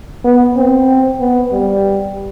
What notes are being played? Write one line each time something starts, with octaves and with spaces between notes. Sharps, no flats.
B3
C4
B3
G3